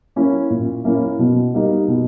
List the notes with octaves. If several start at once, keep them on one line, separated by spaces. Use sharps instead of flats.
A#3 C#4 E4
A#2
A#3 C#4 E4
B2
G3 A#3 D#4
B2